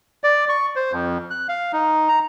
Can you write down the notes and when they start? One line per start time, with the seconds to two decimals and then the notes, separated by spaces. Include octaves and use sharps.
0.24 D5
0.49 C#6
0.76 C5
0.92 F2
1.30 F#6
1.49 F5
1.73 D#4
2.08 A#5